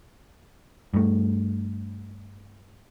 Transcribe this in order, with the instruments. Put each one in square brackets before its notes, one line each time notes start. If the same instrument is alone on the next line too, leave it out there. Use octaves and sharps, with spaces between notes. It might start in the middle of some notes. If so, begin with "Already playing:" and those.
[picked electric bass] G2 A3